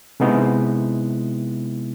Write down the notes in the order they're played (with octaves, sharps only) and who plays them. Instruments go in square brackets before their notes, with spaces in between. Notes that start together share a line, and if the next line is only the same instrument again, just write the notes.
[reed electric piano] C3 G#3 B3 D#4 E4